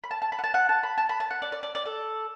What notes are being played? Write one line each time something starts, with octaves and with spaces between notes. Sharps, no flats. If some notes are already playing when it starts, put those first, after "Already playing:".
B5
A5
A5
B5
F#5
A5
F#5
A5
B5
A5
B5
A5
F#5
D5
D5
D5
D5
A4